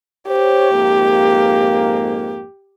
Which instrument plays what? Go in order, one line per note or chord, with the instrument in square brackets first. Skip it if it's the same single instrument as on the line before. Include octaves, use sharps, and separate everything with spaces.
[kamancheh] G4 [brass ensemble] C5 C#5
[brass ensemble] F2 G#2 A#3